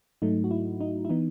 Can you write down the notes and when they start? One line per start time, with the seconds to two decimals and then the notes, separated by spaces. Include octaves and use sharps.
0.22 G#2 F#3 A3 D#4
0.44 F#4
0.51 E4
0.81 D#4
1.05 E4
1.10 E3 B3 D#4